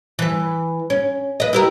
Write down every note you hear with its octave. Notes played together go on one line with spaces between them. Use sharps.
E3 B4
C#4
B4 D#5
E4 G4 A#4